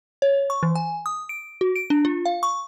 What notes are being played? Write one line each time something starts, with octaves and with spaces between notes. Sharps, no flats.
C#5
C#6
E3
G#5
D#6
D7
F#4
D7
D4
F4
F5
C#6